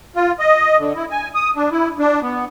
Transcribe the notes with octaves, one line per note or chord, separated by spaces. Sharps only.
F4
D#5
D3
E4
G#5
D#6
D4
E4
D4
B3